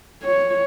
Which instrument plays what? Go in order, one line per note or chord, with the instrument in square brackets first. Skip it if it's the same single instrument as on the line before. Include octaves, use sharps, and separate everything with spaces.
[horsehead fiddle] C#5